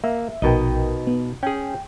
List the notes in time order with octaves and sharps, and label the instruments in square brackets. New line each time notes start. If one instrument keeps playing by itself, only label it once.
[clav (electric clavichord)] A#3 [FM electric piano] E5
[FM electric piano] A#1 A#4 G5 [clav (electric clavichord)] B2 D#4 D#5
[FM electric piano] B3
[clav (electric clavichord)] C#4 G#4 [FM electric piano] G5